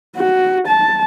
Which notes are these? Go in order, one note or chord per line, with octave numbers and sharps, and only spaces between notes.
F#4
A5